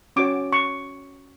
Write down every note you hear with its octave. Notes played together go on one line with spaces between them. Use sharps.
C#4 F#4 C#5 D6
C#6